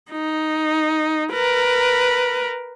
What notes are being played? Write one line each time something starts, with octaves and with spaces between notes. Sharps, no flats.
D#4
A#4 B4